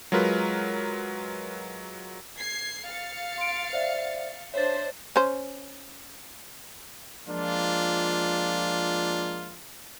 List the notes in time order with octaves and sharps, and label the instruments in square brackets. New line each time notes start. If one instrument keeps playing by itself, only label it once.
[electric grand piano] F#3 G#3 F4 A#4 B4
[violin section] G#6 C7
F5 A6 C#7
[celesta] C6 D7
C5 D5 E5
[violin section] D4 C5 E5 [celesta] C#5 A6
[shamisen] C#4 C5
[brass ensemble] F3 G#3 A#3 D4 F4